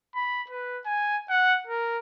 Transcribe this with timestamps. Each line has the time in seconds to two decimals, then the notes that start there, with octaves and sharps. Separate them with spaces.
0.16 B5
0.50 B4
0.86 G#5
1.29 F#5
1.67 A#4